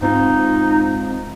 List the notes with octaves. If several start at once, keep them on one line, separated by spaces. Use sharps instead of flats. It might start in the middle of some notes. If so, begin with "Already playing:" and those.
G#2 C4 D#4 F4